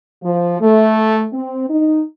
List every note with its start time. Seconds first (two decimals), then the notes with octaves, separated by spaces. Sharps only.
0.24 F3
0.61 A3
1.33 C4
1.70 D#4